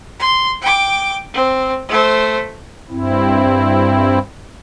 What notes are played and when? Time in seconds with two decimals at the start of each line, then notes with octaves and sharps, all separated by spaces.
0.20 C6
0.62 G5 D6
1.34 C4
1.89 A3 C5
2.90 G2 C4 E4